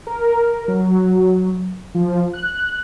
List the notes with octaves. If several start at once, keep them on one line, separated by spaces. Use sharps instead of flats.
A#4
F#3
F3
F#6